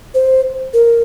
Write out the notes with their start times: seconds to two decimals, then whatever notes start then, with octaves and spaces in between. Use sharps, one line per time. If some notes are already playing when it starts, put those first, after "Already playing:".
0.14 C5
0.73 A#4